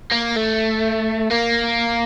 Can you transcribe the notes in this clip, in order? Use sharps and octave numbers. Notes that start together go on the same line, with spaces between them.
A#3
A3
A#3